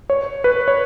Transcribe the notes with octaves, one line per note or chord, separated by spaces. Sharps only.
C#5
B4
C#5